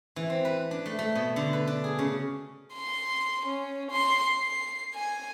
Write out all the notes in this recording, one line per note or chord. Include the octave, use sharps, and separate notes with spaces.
E3
C4
B4
D4
A3
A3
B2
D3
B4
D4
G#4
C#3
C6
C#4
C6
C7
G#5